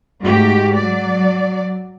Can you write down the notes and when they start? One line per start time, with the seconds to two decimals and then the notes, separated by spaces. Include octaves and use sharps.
0.23 G#2 A3 F#4 G4
0.75 F#3 D5